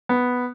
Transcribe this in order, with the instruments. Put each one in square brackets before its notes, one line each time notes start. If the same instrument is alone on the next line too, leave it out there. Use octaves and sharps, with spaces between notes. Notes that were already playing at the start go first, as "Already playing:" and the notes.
[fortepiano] B3